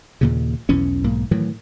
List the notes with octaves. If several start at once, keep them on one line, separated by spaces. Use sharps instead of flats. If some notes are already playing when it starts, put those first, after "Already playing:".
D#2 A#2 C#3
B1 E2 E3 C#4
B1 G#2 A#3
A2 D#3 E3 F#3